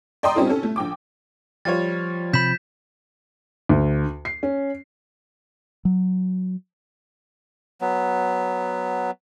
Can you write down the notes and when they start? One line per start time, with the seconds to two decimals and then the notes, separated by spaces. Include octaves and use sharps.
0.23 D5 D#5 G5 A#5 C6 D#6
0.35 G3 C4 C#4 D#4 F4 A4
0.50 C#4 A4
0.63 A3
0.76 A#1 G5 D6
1.65 F3 G3 F4 C#5 A6
2.33 C3 B5 G6 B6 E7
3.69 D2
4.25 C7
4.43 C#4
5.85 F#3
7.81 F#3 B3